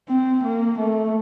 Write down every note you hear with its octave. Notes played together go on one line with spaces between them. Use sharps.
C4
A#3
A3